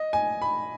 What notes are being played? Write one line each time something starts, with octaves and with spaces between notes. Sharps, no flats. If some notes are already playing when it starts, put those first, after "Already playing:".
Already playing: D#5
G#5
B5